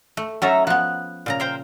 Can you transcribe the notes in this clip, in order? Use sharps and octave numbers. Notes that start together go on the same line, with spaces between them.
A3
F#3 C#4 D#4 A4 E5 A#5
F3 B3 F#6
A#2 C#3 A#5
A#4 C5 G5